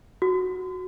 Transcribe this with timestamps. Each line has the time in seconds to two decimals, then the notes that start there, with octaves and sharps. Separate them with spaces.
0.22 F#4